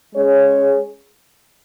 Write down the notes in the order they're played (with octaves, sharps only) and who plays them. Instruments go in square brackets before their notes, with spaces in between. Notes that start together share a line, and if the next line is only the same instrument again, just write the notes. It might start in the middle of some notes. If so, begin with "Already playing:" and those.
[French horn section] G#3 C#4 G#4 C#5